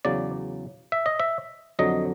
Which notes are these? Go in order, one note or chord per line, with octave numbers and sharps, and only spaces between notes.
E2 C#3 F#3 D5
E5
D#5
E5
F2 D3 F#3 D#5